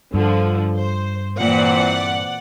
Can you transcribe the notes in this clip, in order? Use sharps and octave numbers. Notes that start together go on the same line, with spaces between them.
G2 D3 F3
C5
A#2 E3 C4 D5 F#5